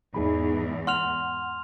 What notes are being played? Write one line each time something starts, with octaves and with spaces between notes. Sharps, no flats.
E2 G#2 D#4 G#4 B5
F#5 C6 F6 F7